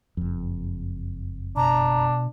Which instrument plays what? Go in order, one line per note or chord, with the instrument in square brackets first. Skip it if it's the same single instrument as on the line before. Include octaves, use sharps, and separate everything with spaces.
[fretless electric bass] F#1 F2
[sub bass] B2 [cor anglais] D4 [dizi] A#5